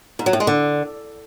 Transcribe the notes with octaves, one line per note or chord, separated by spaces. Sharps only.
G#2
F#3
A2
G#3
D3